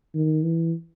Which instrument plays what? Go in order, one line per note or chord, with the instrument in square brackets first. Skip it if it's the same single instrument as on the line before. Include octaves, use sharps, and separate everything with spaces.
[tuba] D#3
E3